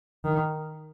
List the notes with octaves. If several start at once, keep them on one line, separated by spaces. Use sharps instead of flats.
D#3